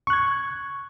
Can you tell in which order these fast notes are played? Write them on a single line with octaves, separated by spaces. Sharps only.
C#6 F#6 G#6